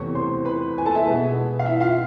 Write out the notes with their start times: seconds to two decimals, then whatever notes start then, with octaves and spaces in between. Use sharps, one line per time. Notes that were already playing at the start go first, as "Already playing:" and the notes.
Already playing: E2 C3 E3 A3 C#5 C#6
0.15 C5 C6
0.45 B4 B5
0.78 G#5
0.85 A4 A5
0.95 E4 E5
1.06 B2 G#3 B3
1.59 F5
1.66 E4 E5
1.80 F4 F5